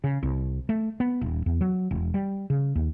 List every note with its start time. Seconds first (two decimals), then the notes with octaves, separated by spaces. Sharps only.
0.04 C#3
0.23 C2
0.69 A3
1.00 B3
1.21 D#1
1.46 E2
1.61 F#3
1.91 E1
2.14 G3
2.50 C#3
2.75 D#2